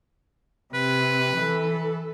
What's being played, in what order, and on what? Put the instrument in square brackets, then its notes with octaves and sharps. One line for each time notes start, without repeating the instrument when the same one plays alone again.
[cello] C3 [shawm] B4
[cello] E3 A4